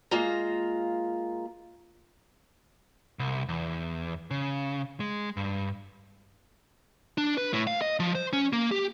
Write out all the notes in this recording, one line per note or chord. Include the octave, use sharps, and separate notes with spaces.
G#3 A#3 F4 A#5
C2
E2
C#3
G#3
G2
D4
B4
A2
F5
D#5
F3
C5
C#4
A#3
G4